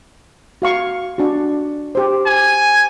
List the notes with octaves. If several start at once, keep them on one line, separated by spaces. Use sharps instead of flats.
F#4 F5 C#6
D4 F#4
G4 C5
G#5